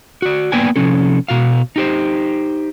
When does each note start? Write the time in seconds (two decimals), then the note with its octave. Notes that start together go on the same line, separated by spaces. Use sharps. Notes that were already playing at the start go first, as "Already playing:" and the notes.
0.22 F#4 D5
0.52 A#3 B3 B4 D5 G5 G#5
0.76 C3 F3 C#4 A4
1.28 B2 F#4 F5
1.76 D#4 G4 C5